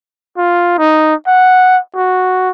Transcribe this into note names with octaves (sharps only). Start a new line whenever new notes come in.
F4
D#4
F#5
F#4